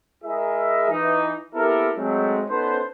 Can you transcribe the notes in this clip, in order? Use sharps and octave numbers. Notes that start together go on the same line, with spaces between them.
G#3 E4 G#4 A#4 D#5 E5
E3 D#4
A#3 B3 E4 G4 A4 A#4
F#3 G#3 A3 C4
B3 C#4 D#4 A4 B4 C5